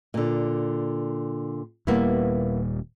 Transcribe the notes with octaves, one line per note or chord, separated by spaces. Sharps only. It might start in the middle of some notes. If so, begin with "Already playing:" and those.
A#2 D3
D#1 A#2 G3 A#3 B3 E4